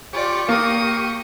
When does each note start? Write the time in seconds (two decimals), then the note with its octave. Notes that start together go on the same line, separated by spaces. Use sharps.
0.13 F4 G4 D5 C#6
0.49 A#3 A#4 D#6